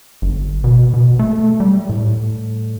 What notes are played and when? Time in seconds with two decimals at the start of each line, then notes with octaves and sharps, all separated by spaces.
0.22 G1
0.64 B2
0.94 B2
1.19 A3
1.60 G3
1.89 A2